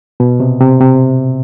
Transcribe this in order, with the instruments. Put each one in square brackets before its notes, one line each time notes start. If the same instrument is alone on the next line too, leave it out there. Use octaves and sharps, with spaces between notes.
[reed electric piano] B2
C3
C3
C3